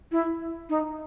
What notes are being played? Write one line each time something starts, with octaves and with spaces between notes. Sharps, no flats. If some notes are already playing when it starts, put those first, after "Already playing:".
E4
D#4